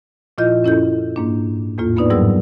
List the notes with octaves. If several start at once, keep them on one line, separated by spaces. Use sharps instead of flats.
A#2 F3 E4 F4 D#5 G6
F#2 C#4 E4 A4 G6
G#2 A#3 D4
E2 A2 A#3 F4
A#3 B3 D4 D#4 B4 D5
F2 G#2 F#3 G3 A#4 E6